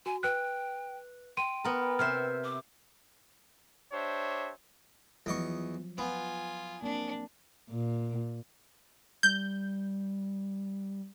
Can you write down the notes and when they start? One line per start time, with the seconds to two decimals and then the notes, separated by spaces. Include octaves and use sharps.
0.06 F#4 G#5
0.23 B4 G5 F#6
1.37 G5 C6 D#7
1.64 B3 A#4
1.99 C3 B4 C5 E5 F6
2.44 D6
3.92 D4 G4 C5 C#5 E5
5.26 E2 F3 F#3 D#5 C#6
5.98 B3 F4 G#5
6.83 A#3 C4 D4
7.70 A#2
9.23 G3 G6